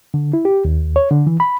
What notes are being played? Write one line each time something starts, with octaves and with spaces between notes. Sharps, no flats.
D3
E4
G4
D#2
C#5
D3
E3
B5